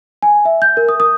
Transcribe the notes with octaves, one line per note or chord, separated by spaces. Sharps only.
G#5
E5
G6
A#4
D#6
D#6